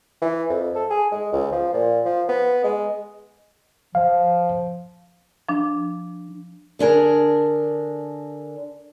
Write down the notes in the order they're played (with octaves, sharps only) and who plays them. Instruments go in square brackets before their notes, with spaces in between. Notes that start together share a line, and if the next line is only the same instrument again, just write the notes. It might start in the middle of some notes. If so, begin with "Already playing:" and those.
[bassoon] E3
F2
A4
G#4
G#3
C#2
F3
A#2
F3
B3
G#3
[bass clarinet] F3 [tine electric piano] F5
[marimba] F3 D4
[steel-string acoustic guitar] D3 D4 G#4 A#4